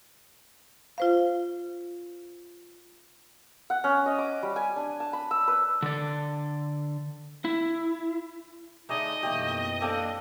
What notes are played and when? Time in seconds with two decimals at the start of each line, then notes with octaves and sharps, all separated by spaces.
0.98 F4 C5 F5
3.70 F#5
3.84 C#4
4.06 D#5
4.19 D6
4.43 G3
4.56 G#5
4.76 D4
5.00 A5
5.13 B5
5.31 E6
5.48 B4
5.82 D3 D5
7.45 E4
8.89 D3 A3 D#4 G#4 D#5 D6
9.23 F#2 B2 E3 A3 A#3 G4
9.81 A#3 C4 D4 A4 G5 A5